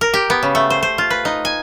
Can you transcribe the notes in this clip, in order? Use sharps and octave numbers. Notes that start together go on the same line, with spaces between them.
A#4
G4
B3
C#3
A3
C5
C5
F4
B4
D#4
G#5